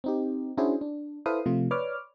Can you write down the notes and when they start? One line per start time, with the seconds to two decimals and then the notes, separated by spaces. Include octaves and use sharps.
0.04 C4 D#4 G4
0.57 C#4 D4 E4 F#4 G#4 C5
0.81 D4
1.26 E4 A4 B4 C5 F5 D#6
1.46 C3 F3 A3 F4
1.71 B4 C#5 D5 D6 F6